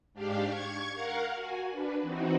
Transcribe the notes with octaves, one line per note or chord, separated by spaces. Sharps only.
G#2 D4 G4 F5
C#6 G#6
A#4 F5 F#5
F#4 G#5
D4 B4
E3 C4 D#4 F#4